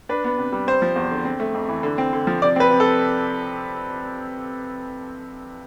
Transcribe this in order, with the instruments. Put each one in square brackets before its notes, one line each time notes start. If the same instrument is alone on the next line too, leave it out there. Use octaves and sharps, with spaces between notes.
[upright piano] D4 B4
B3
C3
G3
C4 C5
F3
E2
D3
C4
A3
F2
E3
D3
C4
D3
F3
C3 D5
C4 B4
C3
A4